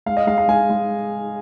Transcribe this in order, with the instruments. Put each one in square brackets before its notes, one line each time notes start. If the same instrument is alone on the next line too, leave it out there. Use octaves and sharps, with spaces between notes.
[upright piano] G#3 F5
D#5
G#3 F5
F5
G#3 G#5
G#3